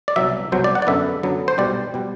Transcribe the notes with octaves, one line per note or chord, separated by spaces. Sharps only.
D5
C2 B2 F#3 E5
C2 B2 F#3 C5
D5
F#5
D5
F#2 D3 F#3 B3 E5
F#2 D3 F#3 B3
C5
B1 B2 G3 D5
B2 G3